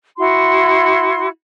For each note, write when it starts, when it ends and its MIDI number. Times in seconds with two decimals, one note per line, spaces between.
0.17 1.27 64
0.17 1.27 66
0.17 1.27 84